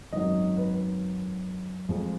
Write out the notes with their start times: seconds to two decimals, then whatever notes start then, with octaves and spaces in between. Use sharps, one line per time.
0.13 G#1 F#2 D#3 F#3 D#5
0.57 B4
1.89 F1 F2 F3 G#3